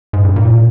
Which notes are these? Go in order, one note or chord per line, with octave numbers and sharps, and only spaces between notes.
G#2
G2
A#2
A#2